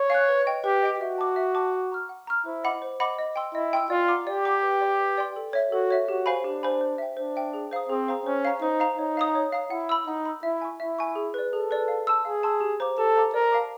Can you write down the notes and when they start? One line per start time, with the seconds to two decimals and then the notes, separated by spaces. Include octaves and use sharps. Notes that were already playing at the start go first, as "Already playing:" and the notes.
Already playing: C#5
0.10 F5 G#5 C#6 F#6
0.28 B4
0.46 D#5 G5
0.64 G4 B4
0.83 D#5 G5
1.00 F#4 E5
1.18 A5 D6
1.36 E5
1.55 A5 D6
1.73 F#5
1.92 A#5 C#6 F6
2.09 F#5
2.27 A#5 C#6 F6
2.46 E4 C5
2.64 D#5 F#5 B5 D6
2.82 C5
3.00 D#5 F#5 B5 D6
3.19 D#5
3.36 G5 C6 E6
3.54 E4 D#5
3.73 G5 C6 E6
3.90 F4 D5
4.08 F#5 A#5 D6
4.27 G4 D5
4.45 F#5 A#5 D6
4.63 B4
4.81 D5 G5 C6
5.00 B4
5.18 D5 G5 C6
5.36 A4
5.53 C#5 E5
5.72 F#4 A4
5.91 C#5 E5
6.08 F#4 G4
6.26 C5 F5 G#5 B5
6.44 D4 G4
6.63 C5 F5 G#5 B5
6.81 C5
6.98 E5 G5
7.16 D4 C5
7.36 E5 G5
7.53 G#4
7.71 C5 F5 A#5 D#6
7.90 C4 G#4
8.08 C5 F5 A#5 D#6
8.26 C#4 C5
8.45 F5 A#5
8.62 D#4 C5
8.80 F5 A#5
8.98 D#4 C#5
9.17 F5 A#5 D#6
9.35 C#5
9.52 F5 A#5 D#6
9.70 E4 F#5
9.89 B5 E6
10.07 D#4 F#5
10.26 B5 E6
10.43 E4 E5
10.61 G#5 C#6
10.80 E4 E5
10.98 G#5 C#6
11.15 G#4
11.34 B4 D5
11.53 G#4 A4
11.71 B4 D5
11.88 F5
12.07 A5 C6 E6
12.25 G#4 F5
12.43 A5 C6 E6
12.61 G4
12.80 C5 F5 A#5 D6
12.98 G4 A4
13.15 C5 F5 A#5 D6
13.34 A#4 D5
13.52 F5 A5 D6